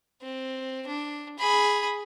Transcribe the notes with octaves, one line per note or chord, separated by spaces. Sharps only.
C4
D4
G#4 B5